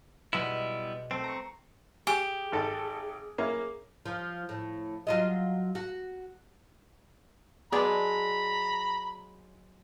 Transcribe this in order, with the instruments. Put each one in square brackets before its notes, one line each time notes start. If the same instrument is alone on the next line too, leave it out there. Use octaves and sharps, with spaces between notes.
[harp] B2 G#3 [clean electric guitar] G3 B3 E4
[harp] A3 [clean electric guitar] C4
[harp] A#5 C#6
[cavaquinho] G4 [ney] G#4 [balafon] G#5
[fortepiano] G#1 A4
A#3 C#4 E4
[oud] F3
A2
F#3 F4 D#5
F#4
[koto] F#3 G#3 D4 [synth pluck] B3 G#4 D5 [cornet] A#5 [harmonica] B5